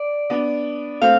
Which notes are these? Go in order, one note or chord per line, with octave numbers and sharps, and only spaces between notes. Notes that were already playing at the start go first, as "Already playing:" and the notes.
Already playing: D5
B3 D4
A3 C4 F5